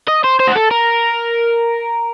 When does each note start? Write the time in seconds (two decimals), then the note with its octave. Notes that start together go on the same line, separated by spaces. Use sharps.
0.08 D#5
0.24 C5
0.40 C5
0.48 F#4
0.56 A4
0.71 A#4